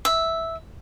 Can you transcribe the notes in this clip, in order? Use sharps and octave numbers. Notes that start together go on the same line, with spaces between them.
E5